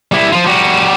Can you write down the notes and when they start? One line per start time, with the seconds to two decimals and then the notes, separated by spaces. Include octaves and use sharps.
0.12 G3 E4
0.32 F3 F4
0.45 G3 F#4